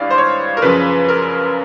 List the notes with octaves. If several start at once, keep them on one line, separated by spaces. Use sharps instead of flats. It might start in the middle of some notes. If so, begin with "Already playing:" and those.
Already playing: G#1 G2 E3 D5 F5
C5
C#5
A#4
F#2 C#3 F3 B4
A#4